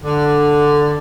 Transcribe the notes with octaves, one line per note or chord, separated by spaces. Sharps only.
D3